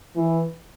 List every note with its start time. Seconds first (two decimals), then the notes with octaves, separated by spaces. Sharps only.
0.16 E3